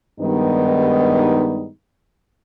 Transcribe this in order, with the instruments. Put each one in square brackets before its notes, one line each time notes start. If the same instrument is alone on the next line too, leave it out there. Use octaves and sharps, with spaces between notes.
[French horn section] G2 D#3 G3 G#3 B3 D#4